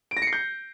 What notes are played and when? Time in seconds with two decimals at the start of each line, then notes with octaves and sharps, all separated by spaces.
0.11 D7
0.17 A#6
0.22 C#7
0.27 C7
0.33 G6